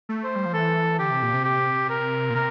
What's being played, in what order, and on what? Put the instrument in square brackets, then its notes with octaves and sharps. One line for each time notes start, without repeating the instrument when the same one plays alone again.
[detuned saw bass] A3
[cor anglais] C5
[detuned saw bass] G3
F3
[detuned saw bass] E3 [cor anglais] A4
[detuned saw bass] D3 [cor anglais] G4
[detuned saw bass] C3
A#2
C3
[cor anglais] G4
A#4
[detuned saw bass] A#2
[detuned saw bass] C3 [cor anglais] A#4